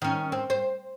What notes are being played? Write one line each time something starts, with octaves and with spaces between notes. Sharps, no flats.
D#3 C#4
C4
C5